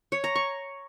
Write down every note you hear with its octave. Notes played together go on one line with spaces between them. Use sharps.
C#5
A#5
C#6